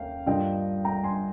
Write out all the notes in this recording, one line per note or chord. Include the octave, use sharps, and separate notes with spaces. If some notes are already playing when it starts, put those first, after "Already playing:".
Already playing: D#2 A#3 C#4 F5 G5
G2 F3 A#3 D#5 G5
G5 A#5
G#5 C6